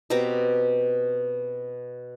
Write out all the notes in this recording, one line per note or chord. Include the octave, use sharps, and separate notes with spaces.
B2 C4 G4 A#5